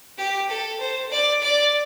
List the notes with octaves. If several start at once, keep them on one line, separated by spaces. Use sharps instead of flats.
G4
A4
C5
D5
D5